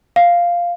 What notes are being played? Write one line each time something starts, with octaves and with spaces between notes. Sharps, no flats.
F5